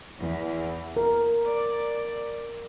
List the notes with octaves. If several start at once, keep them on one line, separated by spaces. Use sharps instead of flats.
E2
A#4
D5